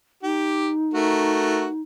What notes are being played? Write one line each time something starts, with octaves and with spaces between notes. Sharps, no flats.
D#4 G4
A3 F#4 A#4